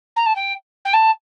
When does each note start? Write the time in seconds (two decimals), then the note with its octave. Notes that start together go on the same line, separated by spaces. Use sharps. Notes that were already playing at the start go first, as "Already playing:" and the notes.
0.16 A#5
0.26 A5
0.36 G5
0.85 G5
0.94 A5